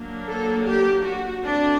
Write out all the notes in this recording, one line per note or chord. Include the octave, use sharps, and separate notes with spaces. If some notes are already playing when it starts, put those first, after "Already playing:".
Already playing: F#3 A#3 D4
A4
G4
F#4
D3 A3 C4 D4